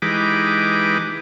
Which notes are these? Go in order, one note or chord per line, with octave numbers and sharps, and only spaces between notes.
E3 G#3 D#4 G4 B4 D6